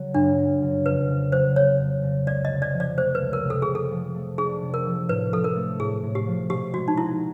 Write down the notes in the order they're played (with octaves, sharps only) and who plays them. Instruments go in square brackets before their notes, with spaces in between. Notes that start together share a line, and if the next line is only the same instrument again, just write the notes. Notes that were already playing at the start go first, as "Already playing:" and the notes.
Already playing: [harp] C#3 F#3
[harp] F#2 [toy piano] D4
[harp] F#2
C#3
[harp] F2 [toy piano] B4
[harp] C#3
[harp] F#3 [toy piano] C5
[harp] B3 [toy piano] C#5
[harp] F2
C#3
[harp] C#2 [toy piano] D5
[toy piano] D#5
[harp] C3
[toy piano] D5
[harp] F3
[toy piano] D5
[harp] A3 [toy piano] C5
[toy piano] B4
[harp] C#2
[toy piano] A#4
[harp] C3
[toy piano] A4
G#4
[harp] C3
[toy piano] A4
[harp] F3
A3
[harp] D4 [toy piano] G#4
[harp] C3
[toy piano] A#4
[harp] F3
[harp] A2 [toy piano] B4
[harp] F3 [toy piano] A4
[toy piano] A#4
[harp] A3
[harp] A2 [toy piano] G#4
[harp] A2
[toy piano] G4
[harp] F3
[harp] B2 [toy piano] G4
[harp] G#3 [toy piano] F#4
[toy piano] D#4
[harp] B3 [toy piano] E4